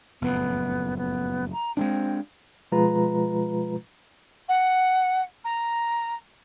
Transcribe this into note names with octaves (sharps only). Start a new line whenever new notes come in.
F#1 F2 A2 B3
B3
A#5
G#3 A#3 C4 D4
B2 F3 G#3 F4 B4 A#5
F#5
A#5